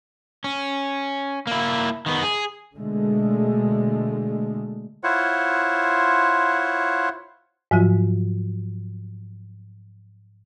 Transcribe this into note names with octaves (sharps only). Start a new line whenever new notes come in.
C#4
A#3 E4
D#3 B3
G#4
B2 D3 G#3 A3
E4 F4 C5 C#5 F#5
G#2 F3 F#3 F4